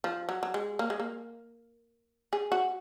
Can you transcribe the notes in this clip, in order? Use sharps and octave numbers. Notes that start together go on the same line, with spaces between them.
F3
F#3
F#3
G#3
A#3
G#3
A#3
G#4
F#4